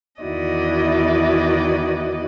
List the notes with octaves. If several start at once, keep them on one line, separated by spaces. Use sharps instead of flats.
E2 D#3 E4 F#4 D5 D#5